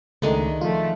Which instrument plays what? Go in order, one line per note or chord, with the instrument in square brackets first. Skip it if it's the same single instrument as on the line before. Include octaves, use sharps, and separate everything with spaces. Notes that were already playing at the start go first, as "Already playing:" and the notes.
[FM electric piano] C#2 A3 [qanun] D#3 G#3 D4
[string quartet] F3 A3 [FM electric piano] F4